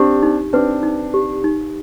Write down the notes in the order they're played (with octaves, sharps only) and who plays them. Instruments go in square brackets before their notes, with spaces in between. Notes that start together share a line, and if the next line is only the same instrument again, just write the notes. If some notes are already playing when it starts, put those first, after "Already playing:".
Already playing: [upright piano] C4 D4 [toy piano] G4
[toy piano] D#4
[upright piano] C4 D4 [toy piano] B4
[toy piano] D#4
G4
D#4